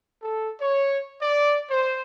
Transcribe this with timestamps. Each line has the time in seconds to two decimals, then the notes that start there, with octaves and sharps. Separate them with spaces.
0.22 A4
0.60 C#5
1.21 D5
1.70 C5